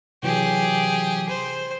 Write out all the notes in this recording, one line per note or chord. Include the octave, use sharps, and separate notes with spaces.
C3 E3 F#3 G4 G#4
C5